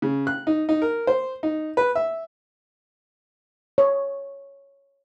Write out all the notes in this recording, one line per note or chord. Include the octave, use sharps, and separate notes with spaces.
C#3
F#6
D#4
D#4
A#4
C5
D#4
B4
E5
C#5